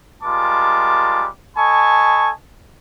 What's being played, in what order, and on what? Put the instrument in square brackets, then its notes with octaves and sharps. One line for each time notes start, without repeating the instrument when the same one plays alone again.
[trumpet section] G3 G#3 F4 A#4 A5 D6
A4 D#5 G#5 A5 B5 C#6